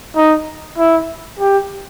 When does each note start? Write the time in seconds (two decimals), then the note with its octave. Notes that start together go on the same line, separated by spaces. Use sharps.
0.16 D#4
0.78 E4
1.39 G4